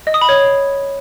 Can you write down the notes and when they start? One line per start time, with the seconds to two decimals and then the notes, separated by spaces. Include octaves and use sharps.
0.07 D#5
0.14 D#6
0.21 B5
0.29 C#5